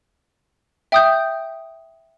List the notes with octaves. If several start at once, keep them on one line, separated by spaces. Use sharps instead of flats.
E5 G5 D#6 G6